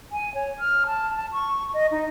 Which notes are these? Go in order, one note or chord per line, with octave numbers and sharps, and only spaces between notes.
G#5
C#5
F6
A5
A5
C#6
D#5
D#4